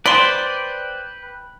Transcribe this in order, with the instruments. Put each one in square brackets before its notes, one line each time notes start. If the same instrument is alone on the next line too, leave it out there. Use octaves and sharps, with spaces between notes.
[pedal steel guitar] B4 G5 [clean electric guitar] C5 D5 [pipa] B5 C6